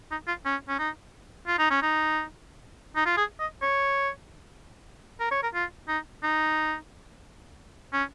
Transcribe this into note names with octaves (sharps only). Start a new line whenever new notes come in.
D#4
F4
C#4
C#4
D#4
F4
D#4
C#4
D#4
D#4
F4
G#4
D#5
C#5
A#4
C#5
A#4
F4
D#4
D#4
C#4